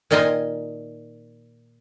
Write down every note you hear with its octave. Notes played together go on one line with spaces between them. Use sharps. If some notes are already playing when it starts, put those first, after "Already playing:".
A#2 D#3 D#4 F4 D#5 G#5